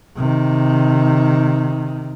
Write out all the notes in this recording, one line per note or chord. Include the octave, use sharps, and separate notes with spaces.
C3 D#3